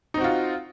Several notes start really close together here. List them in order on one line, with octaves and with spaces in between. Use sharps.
D#4 C4 F#4 F4